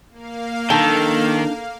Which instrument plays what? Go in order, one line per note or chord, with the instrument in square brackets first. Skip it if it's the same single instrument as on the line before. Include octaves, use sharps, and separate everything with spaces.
[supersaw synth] A#3 F5
[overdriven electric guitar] D#3 [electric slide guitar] D4 D#4 G5 [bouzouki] A4